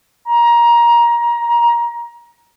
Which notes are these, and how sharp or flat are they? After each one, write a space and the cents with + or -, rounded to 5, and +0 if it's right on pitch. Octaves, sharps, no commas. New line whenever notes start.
A#5 +20